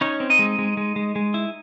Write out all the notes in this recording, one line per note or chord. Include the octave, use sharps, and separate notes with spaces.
C#4 D#4 C#5
C4
D#4 D#5
G#3
G#3
G#3
G#3
G#3
E4